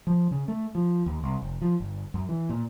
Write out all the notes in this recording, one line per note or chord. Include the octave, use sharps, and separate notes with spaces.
F3
C#3
A3
F3
D#2
C2
F1
F3
G1
F#2
E3
A#2